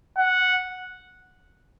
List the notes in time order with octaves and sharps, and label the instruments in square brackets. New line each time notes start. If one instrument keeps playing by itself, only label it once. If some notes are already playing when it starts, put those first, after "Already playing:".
[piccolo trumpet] F#5